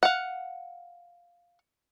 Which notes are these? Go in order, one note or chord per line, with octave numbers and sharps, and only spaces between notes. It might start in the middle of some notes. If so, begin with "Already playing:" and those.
F5 F#5